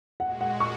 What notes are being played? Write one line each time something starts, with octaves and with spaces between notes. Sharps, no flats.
A#2 G#3 F#4 F#5
F#5
C#6